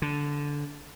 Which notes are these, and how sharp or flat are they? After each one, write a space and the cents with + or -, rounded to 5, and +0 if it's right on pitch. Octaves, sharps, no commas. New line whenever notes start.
D3 -10